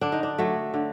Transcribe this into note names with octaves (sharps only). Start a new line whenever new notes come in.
D3 D4
D#4
D4
F#3 A3
D3